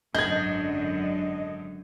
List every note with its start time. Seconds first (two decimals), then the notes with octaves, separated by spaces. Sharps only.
0.15 G#1 F#2 D3 D4 D#5 G6 G#6